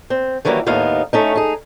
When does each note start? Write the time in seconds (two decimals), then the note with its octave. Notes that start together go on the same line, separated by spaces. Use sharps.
0.10 C4
0.45 D#3 E3 F#3 G3 A#3
0.66 D#2 A2 B3 D#4 F5
1.13 A3 C#4 D#4
1.35 D#4 G#4